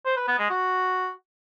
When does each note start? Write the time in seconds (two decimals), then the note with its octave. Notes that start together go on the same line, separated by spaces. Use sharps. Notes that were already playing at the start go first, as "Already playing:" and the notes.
0.05 C5
0.16 B4
0.28 B3
0.39 G#3
0.50 F#4